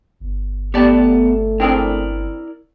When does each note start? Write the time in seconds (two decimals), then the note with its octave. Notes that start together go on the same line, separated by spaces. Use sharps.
0.20 G1
0.74 A3 B3 G4 D5 A5
1.60 C4 D4 E4 G#4 A#4 D5